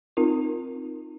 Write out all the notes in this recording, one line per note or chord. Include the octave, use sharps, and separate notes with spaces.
C4 D#4 F4 A#4